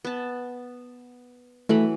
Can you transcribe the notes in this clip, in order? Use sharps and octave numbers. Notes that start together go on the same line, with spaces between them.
B3 A5
E3 F#3 A3 B5